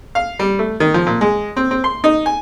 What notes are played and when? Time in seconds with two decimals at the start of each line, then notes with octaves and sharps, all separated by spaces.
0.15 F5
0.39 G3
0.59 A3
0.80 D#3
0.94 F3
1.07 A#2
1.21 G#3
1.56 C4
1.71 C4
1.84 C6
2.04 D#4
2.26 G#5